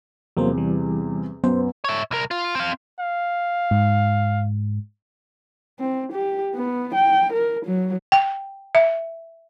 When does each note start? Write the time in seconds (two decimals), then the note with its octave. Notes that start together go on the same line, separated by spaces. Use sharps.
0.37 E2 C3 F#3 A#3 C5
0.58 E3 G3
1.44 F#2 B3 C5
1.84 C#5 E5
2.11 C2 A#4
2.31 F4
2.55 C4 F5
3.00 F5
3.71 G#2
5.80 C4
6.13 G4
6.55 B3
6.94 G5
7.33 A#4
7.66 F#3
8.12 G5
8.75 E5